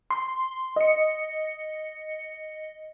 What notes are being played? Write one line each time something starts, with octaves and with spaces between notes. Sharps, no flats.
C6
D#5 C#7